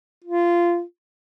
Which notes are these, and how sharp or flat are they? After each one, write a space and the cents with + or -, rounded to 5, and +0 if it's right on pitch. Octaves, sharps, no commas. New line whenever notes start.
F4 -15